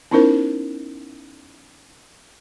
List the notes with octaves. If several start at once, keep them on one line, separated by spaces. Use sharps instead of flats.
B3 C#4 D#4 E4 A#4 C5